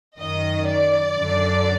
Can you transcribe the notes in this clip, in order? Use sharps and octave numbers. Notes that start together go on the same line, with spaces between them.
F#2 D#3 D#5
D5
F#2 D3